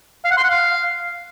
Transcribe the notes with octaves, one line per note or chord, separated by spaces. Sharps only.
F5
F#5
C6
F#5
F5